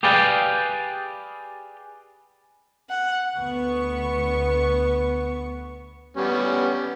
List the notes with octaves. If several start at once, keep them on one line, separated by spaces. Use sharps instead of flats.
G4 G#4 B4 D5 F5 G5
F#5
D2 B3 C#6
G3 B3 C#4